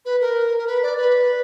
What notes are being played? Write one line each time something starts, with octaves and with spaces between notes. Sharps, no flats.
B4
A#4
A#4
B4
D5
B4